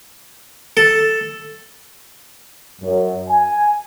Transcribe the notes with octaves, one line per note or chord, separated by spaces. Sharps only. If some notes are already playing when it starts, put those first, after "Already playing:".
A4
F#2
G#5